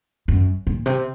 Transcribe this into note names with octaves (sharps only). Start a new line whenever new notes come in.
F#2
A#2
C3